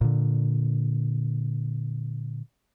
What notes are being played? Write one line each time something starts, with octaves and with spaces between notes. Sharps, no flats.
A#2 D3